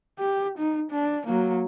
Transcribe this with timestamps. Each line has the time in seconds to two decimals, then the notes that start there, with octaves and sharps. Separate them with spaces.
0.19 G4
0.58 D#4
0.91 D4
1.27 F#3 A#3